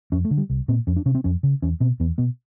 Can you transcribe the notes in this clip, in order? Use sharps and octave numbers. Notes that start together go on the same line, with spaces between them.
F2 C#4
A3
D3
G3
C2
A#2 C4
F2 C#4
D4
C3 C#4
C4
F2 C#4
C#3
E2 C#4
B2 C4
E2 B3
B2 B3